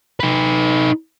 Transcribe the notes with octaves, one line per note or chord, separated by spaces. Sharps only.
D#4 B4